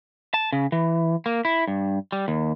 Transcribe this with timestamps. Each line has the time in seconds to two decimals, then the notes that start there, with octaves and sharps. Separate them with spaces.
0.34 A5
0.53 C#3
0.72 E3
1.26 A#3
1.45 E4
1.68 G2
2.12 G3
2.28 D#2